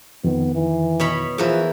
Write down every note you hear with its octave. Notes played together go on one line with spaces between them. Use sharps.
F2 D#3 B3
E3
B2 C#5 B5
E2 E3 F3 A#4